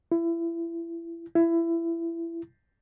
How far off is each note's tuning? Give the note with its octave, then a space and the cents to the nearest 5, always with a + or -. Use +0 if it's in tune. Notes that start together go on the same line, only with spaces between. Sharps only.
E4 +30
E4 +25